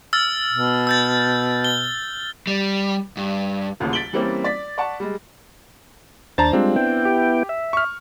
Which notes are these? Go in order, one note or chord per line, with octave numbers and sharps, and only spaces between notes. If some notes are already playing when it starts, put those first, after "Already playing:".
E6 F6 A6
B2
E6 G6 A6
G7
G3
G2
D#1 A1 D#2 C#3
A6 B6 D7 F#7 G7
E3 G3 A#3 C4 C#4
D5 A6 B6
D5 F#5 A5 C#6
G3 G#3
D#2 D4 C5 A5 A#5 A6
G3 G#3 C4 D4 F4
B3 E4 G5
G4
E5
C#6 F6